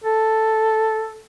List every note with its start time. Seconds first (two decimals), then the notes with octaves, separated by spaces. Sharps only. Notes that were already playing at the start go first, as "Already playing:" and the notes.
0.04 A4